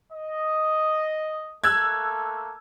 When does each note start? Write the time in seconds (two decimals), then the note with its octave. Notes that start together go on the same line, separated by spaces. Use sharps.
0.13 D#5
1.64 A3 A#3 A4 E6 F#6 G#6